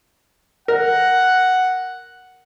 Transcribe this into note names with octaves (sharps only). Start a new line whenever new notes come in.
A#4 F#5